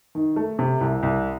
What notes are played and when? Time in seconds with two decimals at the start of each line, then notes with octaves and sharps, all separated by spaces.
0.15 D#3
0.36 A3
0.59 C3
0.81 C2
1.03 C2